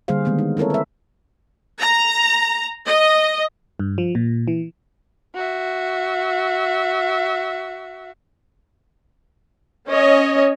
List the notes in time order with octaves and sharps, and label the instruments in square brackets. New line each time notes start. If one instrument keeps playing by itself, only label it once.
[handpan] D3 G3 A#3 G#4 C5 F5
D#3 G#3 A#3 B3
D#4
C4 E4 A4 A#4 C#5
B4 E5
[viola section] A#5
D#5
[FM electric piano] G2
F3
A#2
E3
[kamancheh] F#4 E5
[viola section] C#4 C#5 D#5